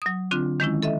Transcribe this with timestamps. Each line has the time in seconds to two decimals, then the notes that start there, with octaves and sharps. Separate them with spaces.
0.02 F#3 D#6
0.31 D3 C4 D4 F4
0.60 D#3 G#3 C#4 E4
0.83 A4 D#5 E5